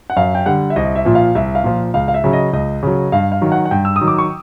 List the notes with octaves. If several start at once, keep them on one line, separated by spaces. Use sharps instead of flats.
F#5
F#2 F5
G5
D3 G3 F#5
E5
C2 D#5
E5
A#2 F3
F5
C2 E5
F5
A#2 F3
C#2 F5
F5
E5
C#3 F#3
D#5
C#2 D#5
C#3 F#3
G2 F5
F5
D#3 F#3
F#5
F#5
G2 G5
E6
D#6
D#3 F#3
D6
C#6